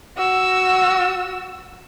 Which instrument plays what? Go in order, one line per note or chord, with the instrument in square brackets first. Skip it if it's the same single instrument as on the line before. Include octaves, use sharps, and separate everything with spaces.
[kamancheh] F#4 E6